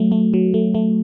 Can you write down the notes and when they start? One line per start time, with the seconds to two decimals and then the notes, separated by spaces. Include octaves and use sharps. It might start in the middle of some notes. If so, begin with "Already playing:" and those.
Already playing: F#3 A3
0.12 A3
0.34 F#3
0.54 A3
0.74 A3